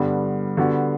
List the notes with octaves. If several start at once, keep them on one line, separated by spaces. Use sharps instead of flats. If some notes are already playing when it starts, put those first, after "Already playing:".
Already playing: G2 D3 G3 B3
D3 G3 B3 F#4